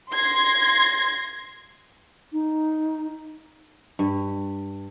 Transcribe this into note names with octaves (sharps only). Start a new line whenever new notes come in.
C6 G#6 A#6 C7
D#4
G2